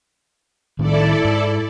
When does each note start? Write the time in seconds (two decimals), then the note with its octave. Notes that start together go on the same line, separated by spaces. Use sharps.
0.79 A2 D#3 E4 A4 D5
1.24 G#2